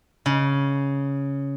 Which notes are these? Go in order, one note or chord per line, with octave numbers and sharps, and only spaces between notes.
C#3